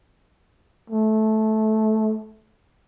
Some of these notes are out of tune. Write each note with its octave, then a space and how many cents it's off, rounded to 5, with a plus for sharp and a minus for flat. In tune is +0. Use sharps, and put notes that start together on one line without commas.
A3 -15